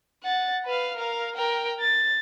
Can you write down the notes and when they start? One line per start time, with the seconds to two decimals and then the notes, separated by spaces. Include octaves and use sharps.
0.23 F#5 A6
0.66 B4 F5
0.96 A#4 F5
1.35 A#4 G5
1.80 A6